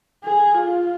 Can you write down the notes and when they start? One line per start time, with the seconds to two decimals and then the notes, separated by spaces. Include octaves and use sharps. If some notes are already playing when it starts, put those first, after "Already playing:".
0.24 G#4
0.54 F4